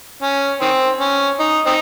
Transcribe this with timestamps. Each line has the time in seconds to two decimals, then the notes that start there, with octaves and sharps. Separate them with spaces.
0.22 C#4
0.61 D#3 C4
1.01 C#4
1.40 D#4
1.66 C4 D#4